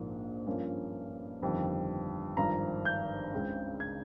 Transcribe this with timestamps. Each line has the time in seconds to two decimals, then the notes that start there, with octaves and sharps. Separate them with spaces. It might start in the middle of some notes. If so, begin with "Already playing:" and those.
Already playing: A#1 G#2 F3 A#3
0.46 G2 F3 A#3 C#4
1.42 G1 F2 D#3 G3
2.37 G#1 G2 F3 A#5
2.85 G6
3.32 C#2 C#3 G#3 C4
3.80 G#6